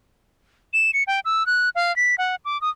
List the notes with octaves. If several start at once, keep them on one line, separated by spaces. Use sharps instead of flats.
E7
C#7
G5
E6
F#6
F5
B6
F#5
D6
D#6